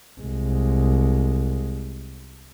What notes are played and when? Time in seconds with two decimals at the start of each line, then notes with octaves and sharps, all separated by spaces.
0.20 C2 G#3